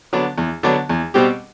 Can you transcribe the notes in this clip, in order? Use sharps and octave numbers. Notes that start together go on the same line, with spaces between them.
D3 F#3 B3 D4
E2
D3 F#3 B3 D4
E2
B2 G3 C4 G4